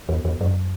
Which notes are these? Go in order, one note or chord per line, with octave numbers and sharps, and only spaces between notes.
E2
E2
F#2